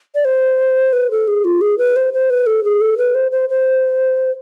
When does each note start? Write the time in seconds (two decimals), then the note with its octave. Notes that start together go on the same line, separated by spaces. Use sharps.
0.15 D5
0.25 C5
0.93 B4
1.11 A4
1.28 G#4
1.45 F4
1.61 G#4
1.78 B4
1.96 C5
2.13 C5
2.30 B4
2.46 A4
2.64 G#4
2.81 A4
2.98 B4
3.15 C5
3.32 C5
3.49 C5